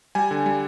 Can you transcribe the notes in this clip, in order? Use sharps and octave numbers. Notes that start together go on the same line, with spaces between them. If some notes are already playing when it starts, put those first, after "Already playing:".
G3 G#5
D3
G3